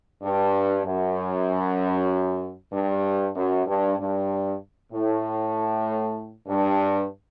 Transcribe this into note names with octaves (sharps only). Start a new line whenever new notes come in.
G2
F#2
G2
F#2
G2
G2
A2
G2